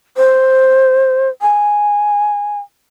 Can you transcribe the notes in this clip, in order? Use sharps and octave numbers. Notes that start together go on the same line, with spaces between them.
C5
G#5